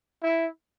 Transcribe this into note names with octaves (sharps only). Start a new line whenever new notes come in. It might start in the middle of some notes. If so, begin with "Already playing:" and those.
E4